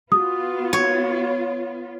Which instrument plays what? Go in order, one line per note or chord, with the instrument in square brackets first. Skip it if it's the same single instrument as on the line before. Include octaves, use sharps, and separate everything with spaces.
[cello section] B3 F4 [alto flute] F#4 [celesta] D#6
[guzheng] C#5